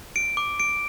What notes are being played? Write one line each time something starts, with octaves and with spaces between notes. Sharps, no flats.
D7
D6
D7